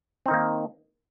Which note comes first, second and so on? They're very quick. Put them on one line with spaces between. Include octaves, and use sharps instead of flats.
C4 D#4 D#3 A#3